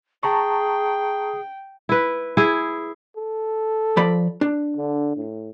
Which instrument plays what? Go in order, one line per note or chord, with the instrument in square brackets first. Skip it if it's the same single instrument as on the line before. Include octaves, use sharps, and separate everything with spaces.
[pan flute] G#4 [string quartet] G5 [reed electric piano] A5 A#5 C#6
[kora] E4 B4
E4 G#4
[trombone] A4
[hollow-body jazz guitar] F3 D5 B5
D4
[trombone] D3
A2